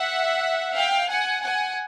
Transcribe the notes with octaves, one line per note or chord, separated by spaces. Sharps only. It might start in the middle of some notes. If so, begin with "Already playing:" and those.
Already playing: E5 F#5
F5 G5
F#5 G#5
F#5 G#5